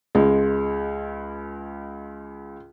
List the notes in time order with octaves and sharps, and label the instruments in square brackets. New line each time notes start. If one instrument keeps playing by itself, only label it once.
[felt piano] C#2 G#3